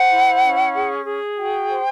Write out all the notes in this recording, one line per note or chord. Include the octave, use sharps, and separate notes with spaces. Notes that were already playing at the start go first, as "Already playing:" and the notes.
Already playing: C5 F#5
E4
C#4
G#4
G#4
F#4 G5
C5